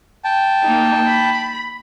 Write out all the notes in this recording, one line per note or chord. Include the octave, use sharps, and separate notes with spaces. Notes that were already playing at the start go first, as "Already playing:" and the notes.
G5 A5
A#3 D#4
B5